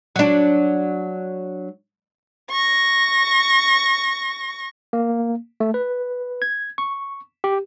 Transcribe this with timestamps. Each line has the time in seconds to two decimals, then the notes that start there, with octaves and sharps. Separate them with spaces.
0.16 F#3 D4
2.52 C#6 A#6
4.93 A#3
5.60 A3
5.74 B4
6.42 G#6
6.78 C#6
7.44 G4